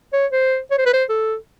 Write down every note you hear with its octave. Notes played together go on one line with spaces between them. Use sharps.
C#5
C5
C#5
C5
B4
C5
A4